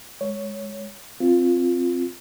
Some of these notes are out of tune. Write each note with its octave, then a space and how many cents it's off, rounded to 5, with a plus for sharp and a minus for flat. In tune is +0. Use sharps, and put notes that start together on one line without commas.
G#3 +0 C#5 +0
C4 +0 F4 +0